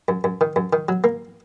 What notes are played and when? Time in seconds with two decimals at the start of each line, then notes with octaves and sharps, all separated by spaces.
0.08 F#2
0.24 F#2
0.41 D#3
0.56 F#2
0.73 D#3
0.89 F#3
1.04 A#3